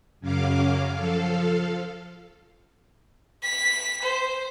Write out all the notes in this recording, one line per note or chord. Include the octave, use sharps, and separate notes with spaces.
F#2 C#3 F#3 C#4 F5 D6
F3 A4 F5
B6
C5